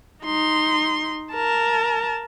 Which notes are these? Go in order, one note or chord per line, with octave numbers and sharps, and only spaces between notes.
D#4 C6
A#4 A5